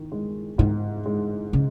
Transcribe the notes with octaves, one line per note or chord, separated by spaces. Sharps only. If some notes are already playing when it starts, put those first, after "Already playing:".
Already playing: D#3
G#3
G#2 D#3
G#3
C#3